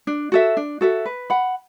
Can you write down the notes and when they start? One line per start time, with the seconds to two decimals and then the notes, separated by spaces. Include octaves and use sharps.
0.07 D4
0.32 F#4 A4 E5
0.57 D4
0.81 F#4 A4 E5
1.06 B4
1.30 F#5 B5